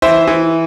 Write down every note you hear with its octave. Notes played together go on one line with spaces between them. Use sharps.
E3 C5 E5
E3